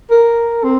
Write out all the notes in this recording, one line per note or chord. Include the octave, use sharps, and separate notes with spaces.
A#4
C4